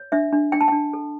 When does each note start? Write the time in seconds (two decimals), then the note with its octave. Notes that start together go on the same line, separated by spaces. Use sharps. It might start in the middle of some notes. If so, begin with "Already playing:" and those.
Already playing: C#5
0.12 D4 E5
0.33 D4
0.52 D4 G5
0.61 A5
0.68 D4 G5
0.93 A4